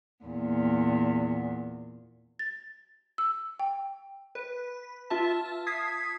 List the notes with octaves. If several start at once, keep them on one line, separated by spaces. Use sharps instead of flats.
E2 A#2
A6
E6
G5
B4
F4 E5 A5
D#6 G#6 B6 C7